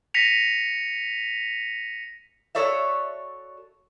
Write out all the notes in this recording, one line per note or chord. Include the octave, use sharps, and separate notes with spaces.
A#6 B6 C#7 D#7 F7
F#4 A4 C#5 D5 E5